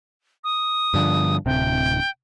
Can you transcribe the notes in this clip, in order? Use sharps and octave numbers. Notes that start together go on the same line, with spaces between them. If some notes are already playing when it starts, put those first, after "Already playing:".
D#6
G2 D3 F3
D1 C3 G5